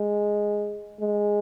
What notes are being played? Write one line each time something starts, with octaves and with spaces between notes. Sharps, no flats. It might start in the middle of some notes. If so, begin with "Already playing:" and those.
Already playing: G#3
G#3